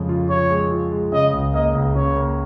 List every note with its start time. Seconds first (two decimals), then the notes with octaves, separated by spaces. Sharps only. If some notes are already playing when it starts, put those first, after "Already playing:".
Already playing: F2 C#3 G#3
0.09 F4
0.29 F4 C#5
0.50 G#3
0.71 F4
0.92 G#3
1.12 C#3 D#5
1.33 C#2
1.54 A#3 D#5
1.75 C#2
1.95 C#3 C#5
2.16 A#3